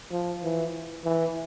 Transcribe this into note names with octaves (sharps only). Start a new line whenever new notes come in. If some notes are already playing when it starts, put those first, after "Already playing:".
F3
E3
E3